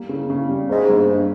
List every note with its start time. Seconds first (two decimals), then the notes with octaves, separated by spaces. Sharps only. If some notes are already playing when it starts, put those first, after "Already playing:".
Already playing: G3 A#3
0.09 C#3
0.30 C#3
0.49 G3
0.69 G#2 A#3
0.89 G2
1.08 G2